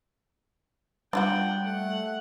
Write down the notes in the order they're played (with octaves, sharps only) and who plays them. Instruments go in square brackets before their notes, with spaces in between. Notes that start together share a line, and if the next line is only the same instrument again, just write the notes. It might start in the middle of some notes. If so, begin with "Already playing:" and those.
[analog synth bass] G3 [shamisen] D4 F4 F#4 [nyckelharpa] F#5 G5
[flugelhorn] A3 [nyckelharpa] F#5